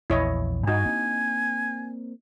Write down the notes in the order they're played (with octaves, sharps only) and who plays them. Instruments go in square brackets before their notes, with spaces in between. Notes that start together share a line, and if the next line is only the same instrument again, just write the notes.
[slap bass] A#1 E2 [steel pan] E4 C#5 D#5
[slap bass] G2 [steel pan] D#4 F#4 [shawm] G#5
[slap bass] A#3 C4 D4